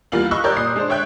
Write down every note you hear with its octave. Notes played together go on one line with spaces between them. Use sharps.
E2 G3 A#3 F4 F5 F#7
D#5 B5 C#6 E6 F#6
G4 A#4 C#5 D5 G6
A#2 D#6 C7
G#3 D4 C5
C#5 E5 G5 F#6 G6